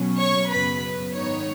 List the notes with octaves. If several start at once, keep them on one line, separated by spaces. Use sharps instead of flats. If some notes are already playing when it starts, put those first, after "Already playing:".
Already playing: B2 F#3 C#4
C#5 C#6
F#2 C#3 F#3 B3 B4 B5
B4
G#2 D#3 B3 D#4 C#5